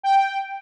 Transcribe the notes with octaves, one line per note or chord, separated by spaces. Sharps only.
G5